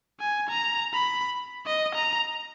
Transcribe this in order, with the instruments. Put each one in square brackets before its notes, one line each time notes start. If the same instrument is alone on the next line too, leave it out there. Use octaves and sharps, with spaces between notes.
[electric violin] G#5
A#5
B5
D#5
A#5